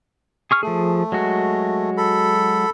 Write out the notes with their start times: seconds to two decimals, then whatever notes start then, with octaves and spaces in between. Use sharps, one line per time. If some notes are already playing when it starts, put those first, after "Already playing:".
0.51 G#4 C#6 F6
0.63 F3 A3 G#4
1.12 F#3 G#3 F#4
1.97 A4 B5